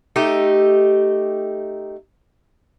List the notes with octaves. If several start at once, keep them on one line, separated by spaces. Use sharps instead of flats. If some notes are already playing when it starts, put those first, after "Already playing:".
A3 D#4 G4